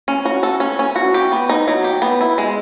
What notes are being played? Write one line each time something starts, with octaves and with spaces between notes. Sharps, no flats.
C#4
F#4
A4
C#4
C#4
F#4
G4
B3
D#4
F#3
G4
B3
E4
G#3